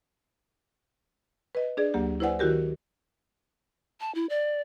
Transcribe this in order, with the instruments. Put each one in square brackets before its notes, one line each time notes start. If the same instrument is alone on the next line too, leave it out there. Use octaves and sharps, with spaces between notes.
[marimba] B4 D#5
D4 G#4 D5
D2 F#3 A#3 G4
E4 B4 C5 D5 F#5 G#5
D#3 E4 F#4 G4 A#4
[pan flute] A5
E4
D5